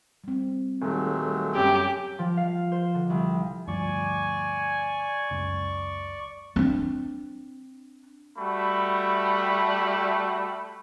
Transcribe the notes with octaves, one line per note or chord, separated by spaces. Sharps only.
G3 C4
D#1 F#3 G#3 A3
F#2 G3 B3 G4
F3
F5
C5
D3
C2
D2 G2 F3 D5 G#5 C#6
F#1 C#2
C4 D4
G3 A3 F#4 B5